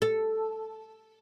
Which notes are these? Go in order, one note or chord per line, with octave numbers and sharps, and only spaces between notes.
A4